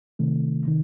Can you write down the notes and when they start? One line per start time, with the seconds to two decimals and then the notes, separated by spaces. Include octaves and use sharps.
0.19 C3 D#3 A3
0.66 C3 D#3